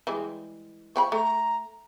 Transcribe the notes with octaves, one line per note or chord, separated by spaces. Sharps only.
E3 G3 G#3
F3 G5 B5 C#6
A3 A#5